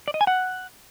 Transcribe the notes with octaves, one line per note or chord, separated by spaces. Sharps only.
D5
D#5
G#5
F#5